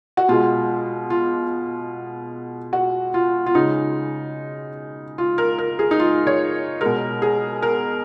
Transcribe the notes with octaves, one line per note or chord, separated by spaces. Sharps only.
F#4
B2 G#3 F4
F4
F#4
F4
F4
C#3 G#3 D#4
F4
A#4
A#4
G#4
D#4
F4
C#5
B2 G#3 A#4
G#4
A#4